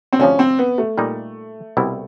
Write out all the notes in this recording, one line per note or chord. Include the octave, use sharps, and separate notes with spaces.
C4
D2 C3 F3 C#4
C4
B3
A3
A#2 G3 A#3 D#4
C2 B2 G3 C4 E4